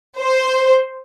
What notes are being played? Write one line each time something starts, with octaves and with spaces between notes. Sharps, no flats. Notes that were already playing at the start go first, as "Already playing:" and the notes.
C5